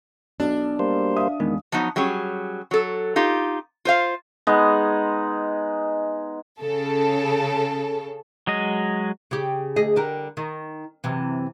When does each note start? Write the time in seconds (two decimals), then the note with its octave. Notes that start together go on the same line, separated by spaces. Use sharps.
0.40 B1 D4
0.79 G3 A#3 C5
1.16 E5 F5 D#6
1.40 E2 D#3 G#3 B3
1.72 F3 F#3 B3 D#4
1.96 F#3 G3 C#4 G#4
2.71 F#3 A4
3.16 D#4 F4 G4
3.85 F4 C5 F5
4.47 G#3 B3 D#4 D#5
6.60 C#3 A4
8.47 F#3 G#3 D#5
9.31 C#3 G4
9.76 D2 G#4 D#5
9.96 D3 G3 A#4
10.37 D#3
11.04 F#2 C3 E3